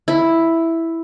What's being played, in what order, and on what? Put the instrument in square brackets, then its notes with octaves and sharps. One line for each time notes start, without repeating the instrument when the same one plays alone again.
[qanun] E4